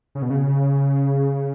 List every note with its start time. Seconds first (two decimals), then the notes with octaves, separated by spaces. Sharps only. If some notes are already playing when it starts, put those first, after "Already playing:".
0.15 C#3
0.22 B2
0.30 C#3